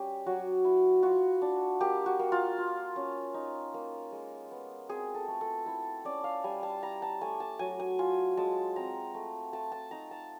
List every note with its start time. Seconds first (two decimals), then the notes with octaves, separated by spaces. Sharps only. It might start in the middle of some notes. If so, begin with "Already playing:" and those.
Already playing: G3 C#4 G4
0.26 F#3 F#4
0.65 E4
1.02 F4 F#4
1.42 D4
1.81 A#3 G4
2.06 F#4
2.19 A#3
2.32 F4
2.58 F4
2.96 C#4
3.34 D#4
3.74 A#3
4.12 G#3
4.51 B3
4.89 C4 G#4
5.15 A4
5.28 A3
5.41 A4
5.66 E4 A4
6.05 C#4 D5
6.24 F5
6.44 G3 G#5
6.63 A5
6.82 E4 A#5
7.02 A5
7.21 A3 G#5
7.40 A5
7.59 F#3 G#5
7.80 G#5
7.99 F4 G#5
8.37 G#3 A5
8.76 C4 A#5
9.14 A3
9.53 A3 A5
9.72 A5
9.91 D#4 A#5
10.11 A5